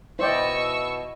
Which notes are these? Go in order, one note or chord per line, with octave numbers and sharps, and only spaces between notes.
B2 E4 C5 D5 D#5 G5 C#6 E6